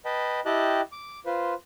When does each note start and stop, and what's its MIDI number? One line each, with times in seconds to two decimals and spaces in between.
0.05 0.40 71
0.05 0.40 75
0.05 0.40 79
0.05 0.40 81
0.05 0.40 83
0.46 0.81 64
0.46 0.81 67
0.46 0.81 75
0.46 0.81 79
0.46 0.81 81
0.46 0.81 90
0.92 1.19 86
1.26 1.54 65
1.26 1.54 71
1.26 1.54 72